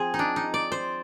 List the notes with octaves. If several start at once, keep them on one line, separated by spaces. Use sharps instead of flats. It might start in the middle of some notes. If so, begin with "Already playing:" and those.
Already playing: F3 C4 G#4
D#4
D4
D#4
D5
C5